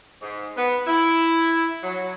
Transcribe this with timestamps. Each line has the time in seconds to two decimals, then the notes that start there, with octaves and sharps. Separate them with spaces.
0.22 G#2
0.57 B3
0.87 E4
1.83 F#3